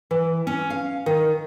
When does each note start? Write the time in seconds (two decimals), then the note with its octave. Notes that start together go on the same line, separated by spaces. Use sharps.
0.11 E3
0.47 C#4
0.70 F5
1.06 D#3